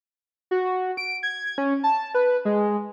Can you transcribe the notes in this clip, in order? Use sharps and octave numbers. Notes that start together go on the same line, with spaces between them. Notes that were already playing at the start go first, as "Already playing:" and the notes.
F#4
D7
G#6
C#4
A5
B4
G#3